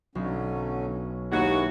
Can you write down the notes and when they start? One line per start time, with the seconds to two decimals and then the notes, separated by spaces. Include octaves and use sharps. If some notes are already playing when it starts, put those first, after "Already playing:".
0.15 B1 D3 F#3 C#4
1.32 D#2 G#3 E4 F#4 A#4